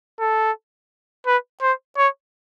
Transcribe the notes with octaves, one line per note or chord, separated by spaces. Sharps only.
A4
B4
C5
C#5